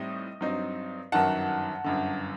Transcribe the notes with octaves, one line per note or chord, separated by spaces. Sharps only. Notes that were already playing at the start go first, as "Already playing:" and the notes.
Already playing: A2 G3 C4 D#4 D#5
G2 F#3 C4 D#4
G1 F#2 D#3 F#3 F#5 A5
G1 F#2 D3